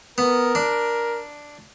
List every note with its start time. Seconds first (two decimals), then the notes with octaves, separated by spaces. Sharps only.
0.18 B3 A#4
0.55 D4